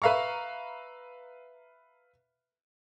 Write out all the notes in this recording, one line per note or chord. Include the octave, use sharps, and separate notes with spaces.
B4 E5 F5 A#5 C#6